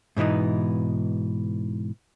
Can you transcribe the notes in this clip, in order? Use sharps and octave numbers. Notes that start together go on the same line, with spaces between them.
G#2 B2 E3 B3 D#4